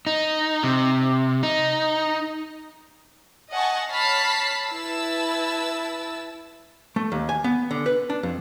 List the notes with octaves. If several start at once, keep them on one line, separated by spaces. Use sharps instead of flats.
D#4
C3
D#4
D#5 F#5 G#5 A5 C#6
C#5 A5 B5 F6 B6 C7
E4 B4 A5 E6
A3
D#2
G#5
B3
D3
B4
D4
F2